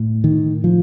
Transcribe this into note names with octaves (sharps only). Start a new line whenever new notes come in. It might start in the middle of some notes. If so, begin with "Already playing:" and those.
Already playing: A2
D#3
F3